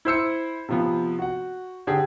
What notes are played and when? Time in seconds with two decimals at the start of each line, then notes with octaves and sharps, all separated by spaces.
0.05 E4 C5 E6 C#7
0.69 C3 F3 B3
1.19 F#4 F#5
1.87 D3 G4 G#4